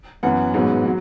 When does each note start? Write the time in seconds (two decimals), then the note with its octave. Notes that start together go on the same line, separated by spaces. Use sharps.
0.23 F#2 E3 B3 F#5
0.54 A1 G#2 F#3 B3
0.85 F#3